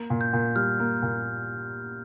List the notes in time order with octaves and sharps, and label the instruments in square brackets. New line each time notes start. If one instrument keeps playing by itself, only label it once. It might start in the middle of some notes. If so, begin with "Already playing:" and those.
Already playing: [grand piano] A#3
A#2
[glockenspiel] G6
[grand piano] A#2
[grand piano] G3 [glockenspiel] F6
[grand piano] A#3
A#2